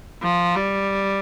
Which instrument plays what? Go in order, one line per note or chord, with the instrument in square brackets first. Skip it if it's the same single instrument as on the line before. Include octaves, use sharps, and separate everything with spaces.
[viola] F3
G3